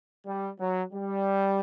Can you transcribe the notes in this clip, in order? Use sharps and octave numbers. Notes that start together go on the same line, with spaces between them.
G3
F#3
G3